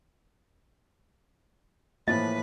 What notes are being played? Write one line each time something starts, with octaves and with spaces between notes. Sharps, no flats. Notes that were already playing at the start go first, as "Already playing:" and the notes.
A2 E3 F3 A#3 B4 D#5